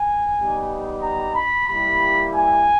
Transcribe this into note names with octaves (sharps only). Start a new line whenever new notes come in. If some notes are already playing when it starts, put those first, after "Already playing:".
Already playing: G#5
G3 B3 D#4 G4
A#5
B5
G3 A#3 E4 G4 B5
G#5